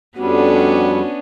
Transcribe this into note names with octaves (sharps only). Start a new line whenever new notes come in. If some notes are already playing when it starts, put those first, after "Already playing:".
F2 G3 B3 C#4 D4 F#4